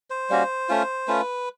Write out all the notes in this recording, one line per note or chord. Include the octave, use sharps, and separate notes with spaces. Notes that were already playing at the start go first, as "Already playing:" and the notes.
C5
G3 A#3 C#4 F#4
A3 C#4 F4
A3 C#4 F4 B4